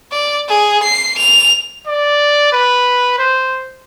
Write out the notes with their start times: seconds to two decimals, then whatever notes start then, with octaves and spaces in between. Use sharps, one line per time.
0.12 D5
0.48 G#4
0.83 C7
1.18 F7
1.87 D5
2.53 B4
3.19 C5